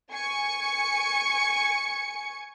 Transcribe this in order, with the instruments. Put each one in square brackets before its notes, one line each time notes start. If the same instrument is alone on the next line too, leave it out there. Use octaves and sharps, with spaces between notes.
[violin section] G#5 C#6 C#7